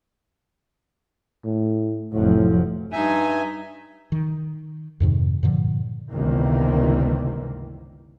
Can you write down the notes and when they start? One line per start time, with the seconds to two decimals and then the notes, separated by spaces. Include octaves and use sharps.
1.45 A2
2.13 F1 A2 F3 F#3
2.92 G2 D#4 E5 G#5
4.12 D#3
5.00 F2 G#2 C3 D#3
5.43 G2 A#2 D3 F3
6.09 G1 C#2 C3 D#3 E3 A#3